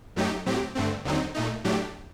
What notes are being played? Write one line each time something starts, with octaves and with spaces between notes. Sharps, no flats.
F#2 F#3 A3 D#4 G4
A2 F#3 C4 G4
G2 D3 A3 C4
D#2 D3 F#3 C4 D#4
A#2 A3 D#4
A2 F#3 A3 D4 G4